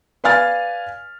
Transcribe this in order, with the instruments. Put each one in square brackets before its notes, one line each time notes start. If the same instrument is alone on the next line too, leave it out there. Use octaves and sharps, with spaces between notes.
[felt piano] B4 D5 F5 G#5 F6 A6